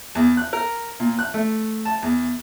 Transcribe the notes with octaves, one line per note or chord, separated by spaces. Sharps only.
E2
F#6
A#4
A#2
F#6
A3
A5
E2